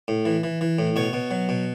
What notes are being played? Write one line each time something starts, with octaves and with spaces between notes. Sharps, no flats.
A2
E3
E3
E3
A2
B2 C#5
B2
F#3
B2